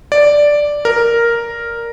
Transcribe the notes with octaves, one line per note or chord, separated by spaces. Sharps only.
D5
A#4